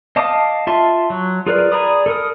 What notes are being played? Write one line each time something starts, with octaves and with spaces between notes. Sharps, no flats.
D#5 F5 A5 D6 D#6
F4 E5 A5 C6
F#3
F4 G#4 A#4 B4 D5
G#4 D5 A#5 B5 D#6
A4 A#4 D#6